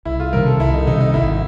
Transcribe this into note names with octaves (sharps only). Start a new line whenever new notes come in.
C2 E4
F4
C3 D#3 G3 A#4
A4
C2 E4
D#4
C3 D#3 G3 D#4
D#4
G#1 E4